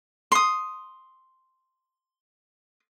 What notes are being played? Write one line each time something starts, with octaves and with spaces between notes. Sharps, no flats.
C6 D#6